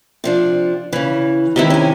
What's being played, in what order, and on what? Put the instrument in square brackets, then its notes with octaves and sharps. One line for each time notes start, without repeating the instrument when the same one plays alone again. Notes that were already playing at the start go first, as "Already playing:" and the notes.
[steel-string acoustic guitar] C3 F3 D4
C#3 E3
[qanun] C3 D#3 E4 [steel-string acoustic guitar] E3 G#3 D#4
[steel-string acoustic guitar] C#4 G#5